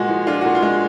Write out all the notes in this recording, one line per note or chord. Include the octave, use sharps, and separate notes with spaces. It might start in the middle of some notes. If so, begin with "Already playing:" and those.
Already playing: A#2 G#3 F#4
F3
D4 F4
A#2 F#4
F4
G#3